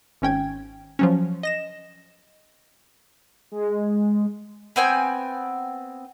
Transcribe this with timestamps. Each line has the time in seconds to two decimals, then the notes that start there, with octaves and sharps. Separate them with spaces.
0.22 G#1 C#4 G5 G#6
0.99 F3 F#3 C#4
1.43 D#5 A#6 E7
3.52 G#3
4.76 B3 C4 G5 G#5